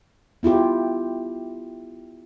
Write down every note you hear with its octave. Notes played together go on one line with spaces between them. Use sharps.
B3 E4 F4 G4